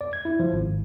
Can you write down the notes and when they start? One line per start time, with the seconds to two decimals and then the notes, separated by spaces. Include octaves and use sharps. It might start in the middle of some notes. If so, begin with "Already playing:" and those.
0.01 D5
0.13 G#6
0.25 E4
0.40 F3
0.53 G#1